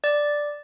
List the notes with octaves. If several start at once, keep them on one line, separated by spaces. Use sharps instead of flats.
D5